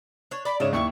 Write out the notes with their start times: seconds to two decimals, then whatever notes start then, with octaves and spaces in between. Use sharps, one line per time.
0.31 D4 C#5
0.45 D5 B5
0.60 G#2 C#3 A3 D4 C#5 D#5 E7
0.73 D#2 E4 C#6